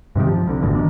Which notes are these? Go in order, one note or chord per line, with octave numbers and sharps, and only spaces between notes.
G2 C3 D#3 G3
F3
C2 D3
G#1 D2 G2 B2
D#3 D4